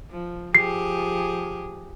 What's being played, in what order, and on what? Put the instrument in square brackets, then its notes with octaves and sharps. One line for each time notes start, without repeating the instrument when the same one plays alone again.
[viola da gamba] F3
[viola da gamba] F3 G4 G#4 [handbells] C7